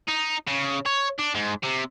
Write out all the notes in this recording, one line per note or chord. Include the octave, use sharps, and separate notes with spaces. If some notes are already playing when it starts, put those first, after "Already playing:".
D#4
C#3
C#5
D4
G#2
C3